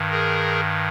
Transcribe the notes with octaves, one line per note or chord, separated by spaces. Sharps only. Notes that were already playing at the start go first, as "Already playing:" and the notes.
Already playing: G2 D#3
G#4 A#4